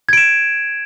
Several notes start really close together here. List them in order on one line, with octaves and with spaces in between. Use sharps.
G#6 D7 E7